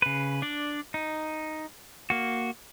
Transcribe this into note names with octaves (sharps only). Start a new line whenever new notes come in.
C#3 B4
D4 D5
D#4
A#3 F#4